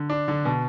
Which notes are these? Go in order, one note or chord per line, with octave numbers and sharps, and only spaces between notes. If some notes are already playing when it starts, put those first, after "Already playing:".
Already playing: D3
D4
D3
B2